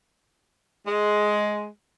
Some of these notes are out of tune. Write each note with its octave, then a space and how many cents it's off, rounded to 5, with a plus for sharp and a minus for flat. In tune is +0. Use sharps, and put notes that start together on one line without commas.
G#3 +10